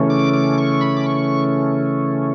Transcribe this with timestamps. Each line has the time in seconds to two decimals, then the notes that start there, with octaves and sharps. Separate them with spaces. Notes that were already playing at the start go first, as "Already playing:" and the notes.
Already playing: C#3 E3 A3 C#4
0.10 D6
0.34 D6
0.58 C#6
0.81 B5
0.97 D6
1.06 C#6